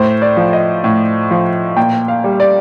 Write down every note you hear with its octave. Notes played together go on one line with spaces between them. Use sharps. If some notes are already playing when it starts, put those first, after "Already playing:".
Already playing: A2 C5
D5
F3
D#5
A2
F3
A#2 G5
F5
G3
D5